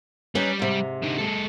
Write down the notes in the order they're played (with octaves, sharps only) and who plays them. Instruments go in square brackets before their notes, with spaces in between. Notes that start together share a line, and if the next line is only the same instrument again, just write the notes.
[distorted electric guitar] G3 [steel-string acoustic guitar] C#4 D#4 B4
[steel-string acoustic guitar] G#2 C3
[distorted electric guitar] D3 D#4
G#3 A4